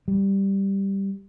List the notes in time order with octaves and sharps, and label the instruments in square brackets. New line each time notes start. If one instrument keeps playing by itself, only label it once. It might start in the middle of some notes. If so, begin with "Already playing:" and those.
[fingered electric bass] G3